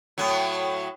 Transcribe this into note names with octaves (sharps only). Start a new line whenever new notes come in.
A2 F#3